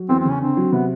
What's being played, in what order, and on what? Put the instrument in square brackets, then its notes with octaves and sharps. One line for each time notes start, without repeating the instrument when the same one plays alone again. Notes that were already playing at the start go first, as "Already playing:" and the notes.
Already playing: [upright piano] F#3
[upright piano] E2 [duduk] C4
[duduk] C4
[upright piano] C#3
[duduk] C#4
[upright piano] D3 [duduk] C4
[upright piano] F#3
[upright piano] C3 [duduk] B3